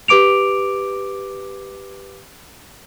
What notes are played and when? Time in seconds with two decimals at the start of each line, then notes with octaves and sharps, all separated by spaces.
0.08 G4 B4 D6 D7 F7